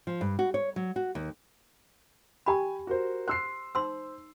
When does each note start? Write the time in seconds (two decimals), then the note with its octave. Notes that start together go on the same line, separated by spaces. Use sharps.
0.07 F3
0.21 G2
0.39 F#4
0.54 C#5
0.76 F#3
0.96 F#4
1.15 D#2
2.46 G4 G5 G#5 B5
2.87 F#4 A#4 C5
3.28 C5 C6 E6 C7
3.75 D#4 C5 C6 E6